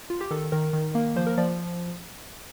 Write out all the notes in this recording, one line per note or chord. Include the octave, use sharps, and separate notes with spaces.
F4
G4
D#3 A4
D#3 A#4
D#3
A#3
F3 C5
A#4
F3 D5